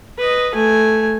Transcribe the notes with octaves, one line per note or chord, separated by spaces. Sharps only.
B4 D#5
A3 G#5